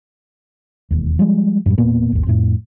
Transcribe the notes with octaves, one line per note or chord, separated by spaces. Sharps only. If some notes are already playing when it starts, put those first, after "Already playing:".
E1 D#2
F3 G3 G#3
F#2 A2 G3
E1 A#2 A#3 B3
G#1 D#2
F2 A2